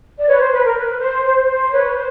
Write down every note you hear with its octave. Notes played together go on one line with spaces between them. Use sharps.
D5
B4 C#5
C5
B4
A#4
B4
C5
C5
C5
B4 C#5
C5